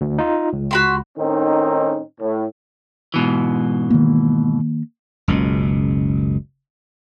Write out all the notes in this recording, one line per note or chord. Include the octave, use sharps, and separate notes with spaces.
D2
D#4 F4
C#2
F#4 B5 C6
A2 D#3 C4 C#4 D#4
A2
G#2 B2 E3
D#3 A#3
F#1 C#2 B2